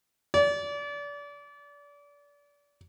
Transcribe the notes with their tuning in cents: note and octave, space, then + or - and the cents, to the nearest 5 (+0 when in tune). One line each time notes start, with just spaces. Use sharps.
D5 -30